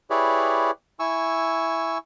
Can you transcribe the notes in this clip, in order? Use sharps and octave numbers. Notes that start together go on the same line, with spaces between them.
E4 G4 G#4 B4 C#5 D5
E4 G#5 C#6 E6